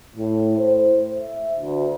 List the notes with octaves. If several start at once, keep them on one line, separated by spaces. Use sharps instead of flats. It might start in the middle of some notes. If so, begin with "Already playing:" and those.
A2
C5
E5
D2